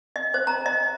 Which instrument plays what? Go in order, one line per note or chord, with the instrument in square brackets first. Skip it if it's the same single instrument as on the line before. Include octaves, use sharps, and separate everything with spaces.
[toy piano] D#5
C5
A#5
D#5